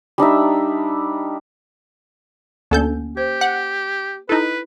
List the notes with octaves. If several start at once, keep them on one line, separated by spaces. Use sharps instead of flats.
G3 D4 D#4 E5
D2 A#3 C#4 A4 G#5 G6
G4 C5
F#5
D#4 E4 A4 B4